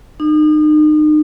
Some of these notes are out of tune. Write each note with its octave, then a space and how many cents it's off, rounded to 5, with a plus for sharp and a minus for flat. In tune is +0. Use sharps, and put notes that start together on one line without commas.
D#4 -35